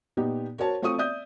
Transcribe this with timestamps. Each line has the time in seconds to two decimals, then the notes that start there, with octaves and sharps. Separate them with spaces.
0.17 A#2 B3 D#4 G4
0.58 F#4 A#4 C5 C#5 A5
0.82 A3 C4 F4 C#6 D#6 D#7
0.98 D5 E5 D#6 G6